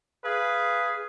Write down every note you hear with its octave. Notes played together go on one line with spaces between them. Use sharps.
G#4 B4 F5